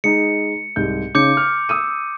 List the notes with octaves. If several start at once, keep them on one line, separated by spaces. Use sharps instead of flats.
G#3 D#4 C#7
C2 G#2 G6
C#3 C#4 D#4 D6 G6 C#7
F6
D#6 E6 D#7